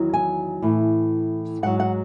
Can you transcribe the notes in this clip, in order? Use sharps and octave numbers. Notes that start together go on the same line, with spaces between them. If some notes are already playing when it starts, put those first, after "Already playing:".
Already playing: E2 D#3 F#3
G#5
A2 E3
G#2 F#3 F#5
F#5